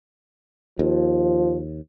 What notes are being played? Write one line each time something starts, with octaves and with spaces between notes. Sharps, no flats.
D#2 F3